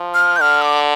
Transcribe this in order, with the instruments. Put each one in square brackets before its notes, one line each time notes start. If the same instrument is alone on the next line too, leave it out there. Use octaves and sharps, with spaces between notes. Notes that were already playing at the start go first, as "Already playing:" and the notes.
Already playing: [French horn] F3
[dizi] F6
G6
[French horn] D3 [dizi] F6
[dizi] D6